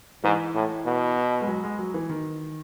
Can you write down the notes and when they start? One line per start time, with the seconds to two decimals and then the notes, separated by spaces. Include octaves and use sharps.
0.24 G#2 E3
0.54 A2
0.86 B2
1.41 G#3
1.47 F#3
1.64 G#3
1.79 F#3
1.94 E3
2.09 D#3